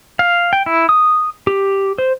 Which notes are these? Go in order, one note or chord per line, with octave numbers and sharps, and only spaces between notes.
F5
G5
E4
D#6
G4
C5